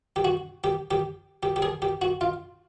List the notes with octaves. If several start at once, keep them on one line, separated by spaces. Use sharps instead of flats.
G4
F#4
G4
G4
G4
G4
G#4
G4
F#4
F4